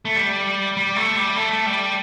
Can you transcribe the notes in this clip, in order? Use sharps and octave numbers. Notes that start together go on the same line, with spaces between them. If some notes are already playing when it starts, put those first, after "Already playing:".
A3
G3
G3
A3
G3
A3
G3